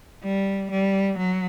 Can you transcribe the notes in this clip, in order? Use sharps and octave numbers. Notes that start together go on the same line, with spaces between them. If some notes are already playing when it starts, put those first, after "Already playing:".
G3
G3
F#3